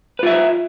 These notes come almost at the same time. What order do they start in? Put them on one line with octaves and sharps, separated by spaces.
B4 F4 E5 D#5